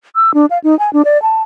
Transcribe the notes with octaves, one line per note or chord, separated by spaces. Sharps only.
E6
D4
F5
D#4
G#5
D4
D5
A5